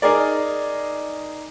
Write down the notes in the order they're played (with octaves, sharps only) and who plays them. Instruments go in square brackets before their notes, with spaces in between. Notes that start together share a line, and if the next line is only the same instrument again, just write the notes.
[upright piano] D#4 G#4 A#4 D5